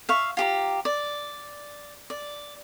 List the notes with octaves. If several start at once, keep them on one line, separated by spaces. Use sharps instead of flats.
E5 F5 C#6
F4 G4 A#5
D5
D5